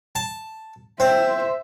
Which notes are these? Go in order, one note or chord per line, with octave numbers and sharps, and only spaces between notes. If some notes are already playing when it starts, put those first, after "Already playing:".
A5
C4 C5 E5